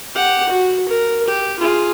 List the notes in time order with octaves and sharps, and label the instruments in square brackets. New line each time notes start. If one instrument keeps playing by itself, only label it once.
[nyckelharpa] G4 F#5
F#4
A#4
G4
F4 G#4